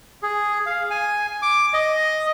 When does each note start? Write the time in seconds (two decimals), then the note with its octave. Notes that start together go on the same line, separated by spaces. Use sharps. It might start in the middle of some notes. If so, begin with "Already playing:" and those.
0.22 G#4
0.66 F5
0.91 G#5
1.42 D6
1.74 D#5